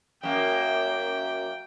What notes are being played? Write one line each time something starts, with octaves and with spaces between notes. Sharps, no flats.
F#2 A#3 G5